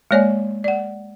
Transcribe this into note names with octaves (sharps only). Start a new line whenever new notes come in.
G#3 A#3 C#5 D5 G#5
D5 F#5